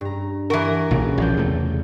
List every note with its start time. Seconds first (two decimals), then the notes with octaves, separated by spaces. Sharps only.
0.01 G2 A#5
0.50 E3 A#4 F#5 A#5 C#6
0.91 B1 A#2 C#3
1.18 A#1 B2 F3 D5 G6
1.37 E2 C3 A3